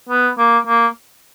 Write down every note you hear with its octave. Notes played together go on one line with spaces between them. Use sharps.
B3
A#3
A#3